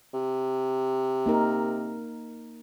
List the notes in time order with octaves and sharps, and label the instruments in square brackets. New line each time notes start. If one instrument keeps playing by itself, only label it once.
[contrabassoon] C3
[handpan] A#3 D#4 A#4